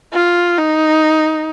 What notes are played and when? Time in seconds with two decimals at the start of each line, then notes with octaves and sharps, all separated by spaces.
0.13 F4
0.58 D#4